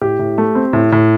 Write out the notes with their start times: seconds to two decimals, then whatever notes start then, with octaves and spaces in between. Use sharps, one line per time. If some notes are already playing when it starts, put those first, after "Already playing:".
0.01 A2 G4
0.19 A2
0.38 A3
0.55 C4
0.73 A2
0.92 A2